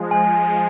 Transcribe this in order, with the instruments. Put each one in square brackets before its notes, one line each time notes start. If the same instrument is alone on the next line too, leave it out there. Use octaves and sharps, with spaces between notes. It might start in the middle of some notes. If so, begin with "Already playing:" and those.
Already playing: [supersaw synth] F3 G#3
[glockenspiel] G#5